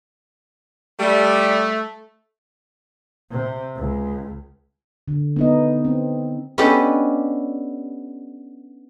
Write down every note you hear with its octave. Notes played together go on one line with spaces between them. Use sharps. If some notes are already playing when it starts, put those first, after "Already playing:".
G3 A3
C3
C#2
D3
B3 D#4 D#5
C4
B3 C#4 D4 G4 A4 D#5